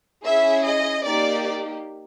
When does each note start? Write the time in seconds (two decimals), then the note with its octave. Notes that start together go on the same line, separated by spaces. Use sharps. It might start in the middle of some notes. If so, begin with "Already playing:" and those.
0.23 C#4 E4 G#4 E5
0.65 D#5
1.05 A#3 D#4 G4 D5